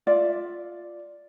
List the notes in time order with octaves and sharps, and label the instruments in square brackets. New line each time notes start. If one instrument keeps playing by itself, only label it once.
[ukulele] F4 D5 E5